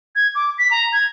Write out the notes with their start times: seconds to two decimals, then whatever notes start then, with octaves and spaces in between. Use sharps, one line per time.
0.15 G#6
0.35 D6
0.58 B6
0.71 A#5
0.93 G#6